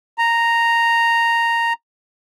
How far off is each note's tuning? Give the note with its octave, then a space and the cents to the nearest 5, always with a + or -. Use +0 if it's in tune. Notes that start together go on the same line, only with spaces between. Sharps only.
A#5 -5